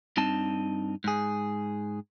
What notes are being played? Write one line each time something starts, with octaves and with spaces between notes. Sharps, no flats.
G2 C4 D#4 A5
G#2 G#4